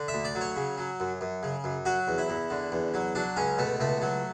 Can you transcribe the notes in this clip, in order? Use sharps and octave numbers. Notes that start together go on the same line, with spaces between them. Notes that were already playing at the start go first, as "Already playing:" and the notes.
Already playing: D3
E5
D2
D5
F#3
C#5
C#3
F#3
F#2
F#2
C#3
F#2
F#3 F#4
E2
E4
E2
D3
E2
F#3
F#3 D4
C#2 C#4
B2 A3
C#2 A3
F#3